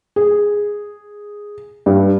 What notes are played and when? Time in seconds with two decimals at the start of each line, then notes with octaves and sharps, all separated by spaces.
0.16 G#4
1.86 G2